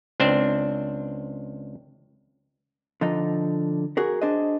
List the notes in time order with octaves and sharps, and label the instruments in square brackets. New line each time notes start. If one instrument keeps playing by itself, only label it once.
[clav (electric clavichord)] C#2 C4 D4 C5
[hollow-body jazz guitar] D3 F3 D#4
F#4 G#4 A#4
D4 G#4 C5 D#5